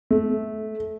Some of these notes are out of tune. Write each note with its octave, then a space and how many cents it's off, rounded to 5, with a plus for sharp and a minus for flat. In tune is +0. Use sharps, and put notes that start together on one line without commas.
A3 -20